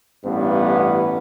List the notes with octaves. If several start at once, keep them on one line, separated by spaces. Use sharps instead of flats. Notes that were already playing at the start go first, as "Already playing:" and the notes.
A1 G2 B3